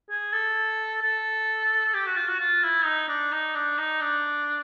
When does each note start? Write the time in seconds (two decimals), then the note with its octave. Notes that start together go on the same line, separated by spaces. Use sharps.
0.10 G#4
0.33 A4
1.03 A4
1.94 G4
2.06 F#4
2.17 F4
2.28 F#4
2.40 F4
2.63 E4
2.86 D#4
3.09 D4
3.32 D#4
3.55 D4
3.78 D#4
4.01 D4